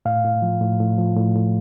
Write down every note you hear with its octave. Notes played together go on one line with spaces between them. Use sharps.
A2 F5
A2
F3
A2
A2
F3
A2
A2